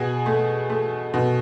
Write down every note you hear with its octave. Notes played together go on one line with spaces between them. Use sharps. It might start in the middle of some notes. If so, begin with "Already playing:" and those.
Already playing: B2 G#4
A3
A3
B2